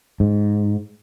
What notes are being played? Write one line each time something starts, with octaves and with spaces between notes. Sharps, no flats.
G#2